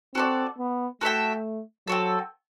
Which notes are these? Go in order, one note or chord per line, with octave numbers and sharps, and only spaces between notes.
C4 F#4 A4 D5
B3
A3 F#4 A4 E5 G5
F#3 C4 F#4 A4